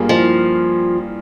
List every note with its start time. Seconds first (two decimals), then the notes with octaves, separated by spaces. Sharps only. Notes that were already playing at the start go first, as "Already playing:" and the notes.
Already playing: G2 G3 A#3 F4 G#4
0.09 F3